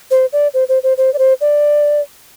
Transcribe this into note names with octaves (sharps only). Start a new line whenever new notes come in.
C5
D5
C5
C5
C5
C5
D5
C5
D5